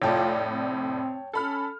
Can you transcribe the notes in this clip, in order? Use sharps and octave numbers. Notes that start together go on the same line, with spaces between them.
F1 A2 F4 C#5 D5 G5 A5
C4
C#4 A4 B5 F6